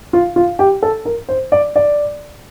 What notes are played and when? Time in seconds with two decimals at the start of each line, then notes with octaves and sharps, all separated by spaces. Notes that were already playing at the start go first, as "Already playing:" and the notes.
0.13 F4
0.36 F4
0.59 G4
0.83 A4
1.05 A#4
1.29 C5
1.52 D5
1.76 D5